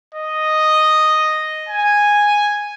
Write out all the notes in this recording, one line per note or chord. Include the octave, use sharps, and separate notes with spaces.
D#5
G#5